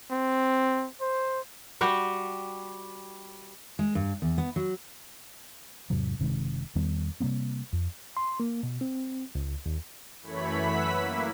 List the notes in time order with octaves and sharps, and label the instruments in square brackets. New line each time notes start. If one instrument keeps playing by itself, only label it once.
[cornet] C4
C5
[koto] G3 F#4 G4
[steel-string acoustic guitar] G#3
G2
E2
B3
F#3
[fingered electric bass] E2 G#2 C3 F#3
F#1 C3 D#3 G#3
E2 D#3 G3 B3
C3 G3 A#3 C4
F2
[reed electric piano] C6
A#3
B2
C4
C#2
D#2
[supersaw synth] F#2 E3 A3 C#5 B5 B6
B4 E5 F#5 B5 E6 B6
A#3 E4